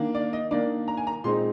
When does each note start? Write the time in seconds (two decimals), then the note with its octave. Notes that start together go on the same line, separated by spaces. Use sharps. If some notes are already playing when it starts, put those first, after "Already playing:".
Already playing: D#3 A#3 D4
0.15 D5
0.33 D#5
0.51 D#3 A#3 D4 D5
0.88 A#5
0.97 G#5
1.07 A#5
1.24 A#2 G#3 C4 D#4 C6